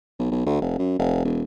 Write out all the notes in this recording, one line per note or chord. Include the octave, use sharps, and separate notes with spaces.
B1
B1
D2
F1
F#2
F1
E1